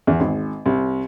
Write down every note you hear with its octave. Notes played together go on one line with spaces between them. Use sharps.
E2
G#1
C2